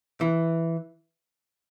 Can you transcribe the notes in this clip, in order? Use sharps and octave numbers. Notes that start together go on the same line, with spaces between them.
E3